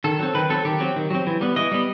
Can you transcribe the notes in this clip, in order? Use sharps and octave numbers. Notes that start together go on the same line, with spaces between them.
D#3 A4
F#3 C4
D#3 B4
F#3 C4 A4
D#3 G4
F#3 C4
D#3
F#3 C4
E3
G3 B3
E3 D#5
G3 B3